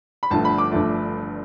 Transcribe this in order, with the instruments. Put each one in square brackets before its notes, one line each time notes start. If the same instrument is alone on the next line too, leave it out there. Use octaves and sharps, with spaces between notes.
[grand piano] B5
G1 G2 F3 A3 A5
B5
D6
G1 G2 F3 A3